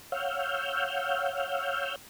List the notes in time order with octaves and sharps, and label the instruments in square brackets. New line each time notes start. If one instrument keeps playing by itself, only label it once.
[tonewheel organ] C#5 F5 F#5 E6 F6 G6